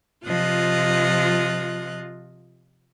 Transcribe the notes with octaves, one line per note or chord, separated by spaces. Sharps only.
C3 F3 F4 D#5 F#6